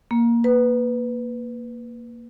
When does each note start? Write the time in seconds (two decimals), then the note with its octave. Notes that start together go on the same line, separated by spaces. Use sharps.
0.11 A#3
0.44 B4